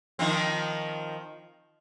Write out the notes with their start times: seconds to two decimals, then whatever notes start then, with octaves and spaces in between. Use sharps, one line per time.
0.19 D#3 F3 C4